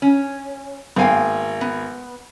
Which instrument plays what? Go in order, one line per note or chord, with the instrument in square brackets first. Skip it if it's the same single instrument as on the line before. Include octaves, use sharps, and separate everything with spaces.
[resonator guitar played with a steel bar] C#4
[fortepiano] G#1 A#3 G#5 [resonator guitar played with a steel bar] B3 F5 G5
[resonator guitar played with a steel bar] B3